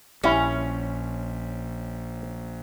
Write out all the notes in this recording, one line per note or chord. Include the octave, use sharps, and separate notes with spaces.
A#1 G3 C#4 E4